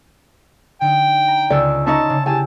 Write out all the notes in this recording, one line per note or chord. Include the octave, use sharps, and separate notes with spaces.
D3 D#4 G5
A#5
C#2 D3 D5 E6
C#4 D#4 D#5 E5 A5 C6 C#6
C#3
E4 G4 G#4 G#5 A5